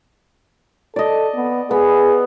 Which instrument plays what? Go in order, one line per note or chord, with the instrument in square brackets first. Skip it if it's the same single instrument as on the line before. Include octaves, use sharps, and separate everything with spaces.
[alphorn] A4 [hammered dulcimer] D5 D#5
[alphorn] B3
[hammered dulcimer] B3 [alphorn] G#4